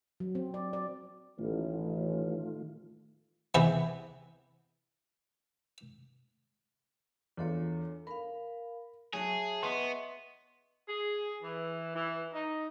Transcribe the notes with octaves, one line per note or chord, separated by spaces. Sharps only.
F#3
C4
D5
D5
A1 D#3 A3 F4
C3 E3 B3 E4 G#4
E2 D4 F4 A4 C#5
A#4 F5 B5
F#3 F#4 G#4 C#5 E5 A5
B3 D#5 E5 C6 C#6
G#4
E3
E3
D#4